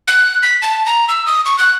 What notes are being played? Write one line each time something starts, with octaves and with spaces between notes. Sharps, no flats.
F#6
B6
A5
A#5
E6
D#6
C#6
F#6